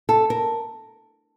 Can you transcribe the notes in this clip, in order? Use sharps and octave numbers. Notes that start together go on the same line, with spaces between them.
A4
A#4